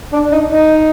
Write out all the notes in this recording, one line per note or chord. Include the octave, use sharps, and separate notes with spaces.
D4
D#4
D#4